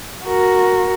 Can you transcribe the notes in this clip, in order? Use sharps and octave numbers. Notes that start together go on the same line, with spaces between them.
F#4 A#4